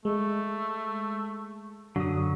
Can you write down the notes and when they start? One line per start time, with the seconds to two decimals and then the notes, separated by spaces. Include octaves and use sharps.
0.05 G#3 A3
1.96 F#2 D3 F#3 D#6